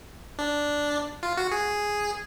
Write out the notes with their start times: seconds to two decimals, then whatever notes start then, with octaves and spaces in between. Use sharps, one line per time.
0.39 D4
1.23 F4
1.37 F#4
1.51 G#4